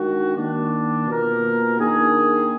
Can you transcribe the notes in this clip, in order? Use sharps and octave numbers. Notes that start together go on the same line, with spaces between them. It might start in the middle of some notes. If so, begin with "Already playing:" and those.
Already playing: D#3 G#3 D4 F#4
D#3 A#3 D4
B2 A#3 F4 A#4
D#3 A#3 D4 G#4